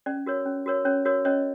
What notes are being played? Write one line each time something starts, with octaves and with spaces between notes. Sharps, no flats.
C#4 D5
F#4 A#4 C#5
C#4
F#4 A#4 C#5
C#4 C#5
F#4 A#4 C#5
C#4 C#5 D#5